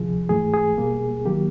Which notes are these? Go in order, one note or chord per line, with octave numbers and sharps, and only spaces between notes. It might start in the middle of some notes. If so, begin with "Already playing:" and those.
Already playing: D2 C3 F3 G#4
G#2 E3 A3 G#4
G#4
B2 G3 A#3
D#3 F#3 A#3 G4